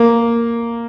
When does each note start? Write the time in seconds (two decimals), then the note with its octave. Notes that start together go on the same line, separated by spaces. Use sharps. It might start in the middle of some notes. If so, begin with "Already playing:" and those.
Already playing: A#3